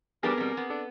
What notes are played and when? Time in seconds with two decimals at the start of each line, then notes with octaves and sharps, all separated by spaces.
0.23 G3 B3 D4 G4 G#4 A#4 B4 D6
0.37 B2 G3 C4
0.57 B3
0.70 D4 A4